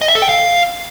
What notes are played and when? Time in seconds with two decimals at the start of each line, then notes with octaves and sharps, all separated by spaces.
0.01 D#5
0.08 E5
0.15 A4
0.22 G5
0.29 F5